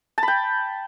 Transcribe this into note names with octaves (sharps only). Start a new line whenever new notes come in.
A5
B5
G5